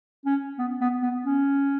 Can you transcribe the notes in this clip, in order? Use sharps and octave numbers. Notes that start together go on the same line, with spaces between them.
C#4
B3
B3
B3
C#4